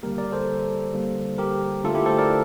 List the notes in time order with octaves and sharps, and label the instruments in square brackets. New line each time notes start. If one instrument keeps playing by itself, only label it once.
[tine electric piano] D3 G3 A#3 G4 A#4
A#4 D5
A4 C5
D3 G3 A#3
G4 A#4
D3 A3 F4 A4
E4 G4
A4 C5
A#4 D5